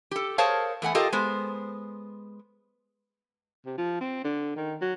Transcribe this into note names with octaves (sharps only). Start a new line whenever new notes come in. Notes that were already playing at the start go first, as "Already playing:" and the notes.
G4 A4
G#4 A#4 C5 C#5 F5 A5
E2 A3 F#5 G#5
F4 G4 A4 A#4 D#5 F5
G#3 B3 C5
C3
F3
C4
D3
D#3
F#3